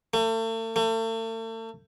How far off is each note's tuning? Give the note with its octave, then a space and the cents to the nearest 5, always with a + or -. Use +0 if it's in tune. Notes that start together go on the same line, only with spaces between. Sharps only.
A3 +40
A3 +40